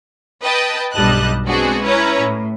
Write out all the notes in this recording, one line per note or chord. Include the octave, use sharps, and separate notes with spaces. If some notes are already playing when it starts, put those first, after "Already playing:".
B4 D#5 G5 A5
B1 G2 G3 D#5 A5 F#6
G#3 B3 C4 D4 F#4 G#4
C#4 E4 B4 C#5 A#5
A2